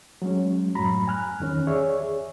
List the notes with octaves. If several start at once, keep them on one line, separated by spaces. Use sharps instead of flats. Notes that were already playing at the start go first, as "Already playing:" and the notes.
F#3 G#3 C#4
F#2 A2 F#3 A#5 B5
G#5 F6 F#6
E2 D#3 C#4
G#4 C#5 D5 E5
G#4